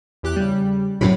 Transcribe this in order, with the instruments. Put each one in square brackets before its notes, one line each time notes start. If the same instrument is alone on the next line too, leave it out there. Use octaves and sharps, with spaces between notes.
[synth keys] E2 G4 F#6
C#3 G3
[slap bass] F#2 A2 C3 [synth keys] F#3 B5